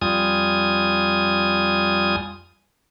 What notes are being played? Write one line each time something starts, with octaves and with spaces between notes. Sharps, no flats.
F2 G3 F4 G#5 D#6